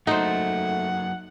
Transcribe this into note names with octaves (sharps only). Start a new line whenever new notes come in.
F#3 A3 A#3 D#4 C5 F#5